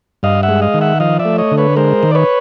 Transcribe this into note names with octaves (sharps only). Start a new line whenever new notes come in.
G2 D#5 F5
E5 F#5
G#3
D#5 F5
D#3
E5 F#5
F3 D#5 F5
D5 E5
A3
C#5 D#5
D3
B4 C#5
G#3 A#4 C5
D#3
D5
B4 C#5